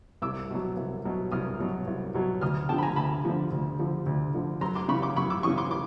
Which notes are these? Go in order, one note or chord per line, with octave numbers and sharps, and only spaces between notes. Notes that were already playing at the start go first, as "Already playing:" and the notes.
C2 D6 E6
B2 F#3
C2
B2 F#3
C2 D#6 F6
B2 F#3
C2
B2 F#3
D2 D#6 F6
D3 F3 G5 A5
B5
G#5 A#5
D2 A5 B5
D3 F3
D2
D3 F3
D2
D3 F3
F#2 A#5 C6
C6 D6
C#3 E3 B5 C#6
C6 D6
F#2 B5 C#6
D6 E6
C#3 E3 C#6 D#6
C6 D6
C6 D6